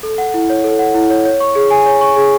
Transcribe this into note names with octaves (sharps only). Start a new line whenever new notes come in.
A4
F#5
E4
C#5
A4
F#5
E4
C#5
C#5
C#6
G#4
G#5
C#5
C#6
G#4